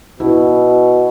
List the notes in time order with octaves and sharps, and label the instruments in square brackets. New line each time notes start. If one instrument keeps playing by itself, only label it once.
[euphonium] B2 [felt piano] E4